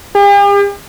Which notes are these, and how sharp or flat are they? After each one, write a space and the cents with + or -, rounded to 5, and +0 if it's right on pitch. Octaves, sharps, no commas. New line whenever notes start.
G4 +45